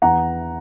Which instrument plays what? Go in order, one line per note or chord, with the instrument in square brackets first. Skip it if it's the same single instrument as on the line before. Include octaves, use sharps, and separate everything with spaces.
[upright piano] E2 F#5 A#5